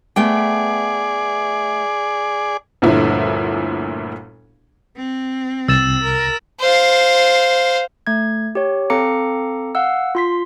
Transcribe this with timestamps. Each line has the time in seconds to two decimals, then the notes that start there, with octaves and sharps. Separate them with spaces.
0.16 A3 B3 G#4 D5 G5
2.82 G1 D2 A#2 A3 E4
4.96 C4
5.68 C2 E6 A6 E7
6.04 A#4
6.61 C5 F5
8.07 A3 G#6
8.55 G4 C#5
8.90 C4 A4 F5 A#5 D6 C#7
9.75 F5 F#5 E6
10.15 F4 C6 B6